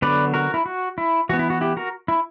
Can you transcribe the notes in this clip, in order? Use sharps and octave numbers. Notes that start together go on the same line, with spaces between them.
D3 F#3 B3 B4 D5
F#4 A#4
E4
F#4
E4
E3 B3 F#4
E4
F#4
E4 G4
F#4 A#4
E4